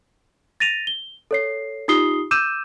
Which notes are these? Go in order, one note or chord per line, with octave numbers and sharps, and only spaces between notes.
A6 A#6 D#7 F7
G7
A4 C#5 C7
D#4 F4 G4 D#6 C7 G7
D6 E6 G6 D#7 E7